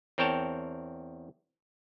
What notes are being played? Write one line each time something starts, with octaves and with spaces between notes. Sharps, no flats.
E2 C4 A#4 C#5 G5 A5